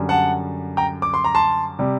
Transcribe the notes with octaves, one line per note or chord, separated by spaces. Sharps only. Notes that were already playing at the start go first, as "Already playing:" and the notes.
Already playing: F#2 D3 G3
F#5 A5
G5 A#5
D6
C6
A#5
A5 C6
C3 G3